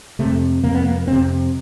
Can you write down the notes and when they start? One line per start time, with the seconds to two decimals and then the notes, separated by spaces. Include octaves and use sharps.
0.19 C3 A3
0.23 F2
0.63 F2 C3 A#3
0.74 B3
0.86 A#3
1.07 F2 C3 C4